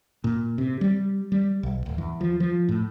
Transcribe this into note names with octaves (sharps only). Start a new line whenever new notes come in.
A#2
C3
G3
G3
B1
D1
E2
F3
F3
A2